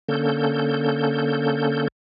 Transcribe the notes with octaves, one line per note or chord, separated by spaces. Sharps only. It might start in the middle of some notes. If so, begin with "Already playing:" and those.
D3 A#3 C#4 A4 G6